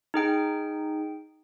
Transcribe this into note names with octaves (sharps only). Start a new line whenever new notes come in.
D#4 G#4 G5